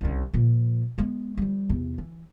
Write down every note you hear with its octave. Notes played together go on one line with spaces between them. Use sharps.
C2 C#3
A#2 F3
G#3 B3
F3 G3
E2 C3
E3